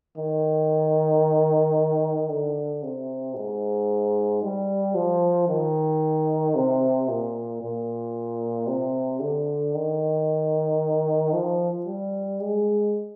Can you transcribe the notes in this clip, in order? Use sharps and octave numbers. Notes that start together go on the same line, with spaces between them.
D#3
D3
C3
G#2
G3
F3
D#3
C3
A#2
A#2
C3
D3
D#3
F3
G3
G#3